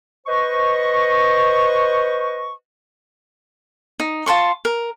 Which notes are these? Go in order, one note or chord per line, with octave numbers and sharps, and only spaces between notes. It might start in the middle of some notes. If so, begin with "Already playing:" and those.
B4 C5 D#5 C#6
D#4
F4 A5 C6 C#6
A#4